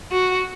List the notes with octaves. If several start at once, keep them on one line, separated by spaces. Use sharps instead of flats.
F#4